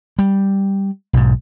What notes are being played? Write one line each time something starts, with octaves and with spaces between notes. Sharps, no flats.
G3
B1 G#2